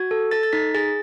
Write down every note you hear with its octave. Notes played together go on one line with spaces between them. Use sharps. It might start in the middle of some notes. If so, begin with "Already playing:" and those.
Already playing: F#4 G#6
A4
A4 A6
A6
D#4 B6
G#4 A6